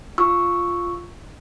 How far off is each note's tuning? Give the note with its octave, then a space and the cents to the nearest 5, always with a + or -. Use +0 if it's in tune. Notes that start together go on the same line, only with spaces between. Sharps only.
F4 +0 C#6 +0 E6 +0